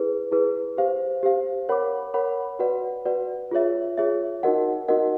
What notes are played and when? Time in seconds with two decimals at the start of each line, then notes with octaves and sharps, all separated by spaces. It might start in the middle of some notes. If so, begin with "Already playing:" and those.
Already playing: E4 G#4 B4
0.31 E4 G#4 B4
0.77 G4 C5 F5
1.23 G4 C5 F5
1.69 A#4 C#5 F#5 B5 D6
2.14 A#4 C#5 F#5 B5 D6
2.59 F#4 B4 D5 F#5
3.05 F#4 B4 D5 F#5
3.51 F4 G#4 C#5 E5
3.98 F4 G#4 C#5 E5
4.43 D#4 F#4 A#4 D#5 F#5
4.88 D#4 F#4 A#4 D#5 F#5